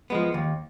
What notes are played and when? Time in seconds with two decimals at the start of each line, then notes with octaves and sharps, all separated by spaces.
0.10 F3 G#3 B3
0.34 D#2